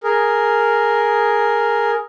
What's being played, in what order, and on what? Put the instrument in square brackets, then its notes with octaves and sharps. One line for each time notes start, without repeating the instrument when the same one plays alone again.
[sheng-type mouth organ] G#4 A#4